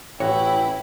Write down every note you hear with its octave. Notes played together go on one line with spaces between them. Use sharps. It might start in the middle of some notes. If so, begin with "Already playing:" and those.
A1 E4 F#4 C#5 G5